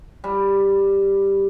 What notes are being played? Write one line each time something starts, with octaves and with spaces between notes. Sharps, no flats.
G3